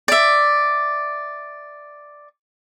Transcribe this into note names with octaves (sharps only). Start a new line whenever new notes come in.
D5 E5